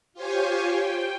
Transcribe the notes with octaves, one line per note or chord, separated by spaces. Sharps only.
F4 G4 C5 C#5 G#5
G5